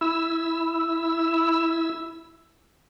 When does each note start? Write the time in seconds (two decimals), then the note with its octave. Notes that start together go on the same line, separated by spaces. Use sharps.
0.01 E4 E6